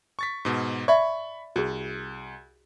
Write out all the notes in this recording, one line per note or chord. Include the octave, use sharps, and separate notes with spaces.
C#6 A6 B6
G#2 B2
D5 E5 B5 C#6
C2 F#4 G#4